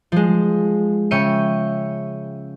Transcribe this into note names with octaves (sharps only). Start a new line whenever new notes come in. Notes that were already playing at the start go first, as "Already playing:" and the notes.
F3 G#3
C#3 C#4 E5 G5 C#7 D#7